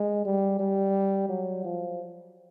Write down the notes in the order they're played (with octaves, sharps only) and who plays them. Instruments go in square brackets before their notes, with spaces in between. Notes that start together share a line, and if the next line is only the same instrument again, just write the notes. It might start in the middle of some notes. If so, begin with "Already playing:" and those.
Already playing: [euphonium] G#3
G3
G3
F#3
F3